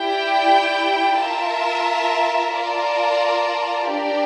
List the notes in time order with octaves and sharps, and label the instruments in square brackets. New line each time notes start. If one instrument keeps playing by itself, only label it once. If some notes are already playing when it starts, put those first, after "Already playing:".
Already playing: [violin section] E4 G4 D5 G5
F4 A#4 E5 A5
F4 A#4 D5 A5
D4 G4 A#4 D5